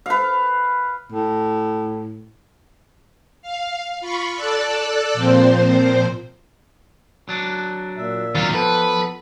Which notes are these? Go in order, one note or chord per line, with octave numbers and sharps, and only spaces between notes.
B4 F5
A2
F5
F4 B5 C#6
A4 D5 E6 F#6
A#2 F3 C4 C5
F#3 D4
A#2 E5
D#2 F#3 F4 F5
F3 B3 A4 B4